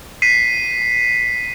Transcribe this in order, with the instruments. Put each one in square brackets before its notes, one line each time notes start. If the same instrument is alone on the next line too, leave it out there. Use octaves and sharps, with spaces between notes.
[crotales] B6 C7 D#7